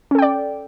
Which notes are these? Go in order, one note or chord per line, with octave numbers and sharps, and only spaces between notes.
C#4 A4 D5 G5